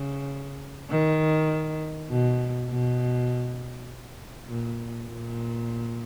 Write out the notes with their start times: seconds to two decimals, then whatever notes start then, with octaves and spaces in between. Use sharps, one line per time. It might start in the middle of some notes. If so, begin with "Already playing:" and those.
Already playing: C#3
0.90 D#3
2.09 B2
2.69 B2
4.48 A#2
5.08 A#2